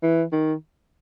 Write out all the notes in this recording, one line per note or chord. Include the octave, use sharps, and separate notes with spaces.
E3
D#3